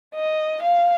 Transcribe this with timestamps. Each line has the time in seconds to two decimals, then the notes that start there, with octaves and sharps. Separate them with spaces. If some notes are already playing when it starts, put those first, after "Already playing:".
0.15 D#5
0.62 F5